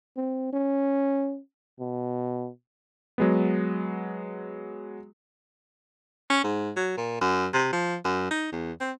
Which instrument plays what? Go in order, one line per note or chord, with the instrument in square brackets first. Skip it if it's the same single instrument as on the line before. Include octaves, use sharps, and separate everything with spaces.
[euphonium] C4
C#4
B2
[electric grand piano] F#3 G#3 B3
[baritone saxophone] C#4
G#2
F#3
A#2
F#2
C3
F3
F#2
D#4
E2
C4